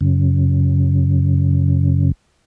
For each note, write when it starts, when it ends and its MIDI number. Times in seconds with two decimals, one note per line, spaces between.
0.01 2.11 42
0.01 2.11 49